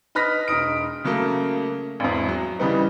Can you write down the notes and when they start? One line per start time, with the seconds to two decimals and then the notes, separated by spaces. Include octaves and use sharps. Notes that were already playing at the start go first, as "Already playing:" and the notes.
0.15 D#4 B4 B5 F6 A#6 B6
0.48 E1 D#4 D#6 D7
1.04 C#3 F#3 A3 A#3
2.00 G#1 E2
2.29 F#3
2.59 C#3 E3 G3 B3 D#4